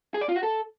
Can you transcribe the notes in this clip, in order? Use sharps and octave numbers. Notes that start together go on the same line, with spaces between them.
G#4
D5
F4
F#4
A4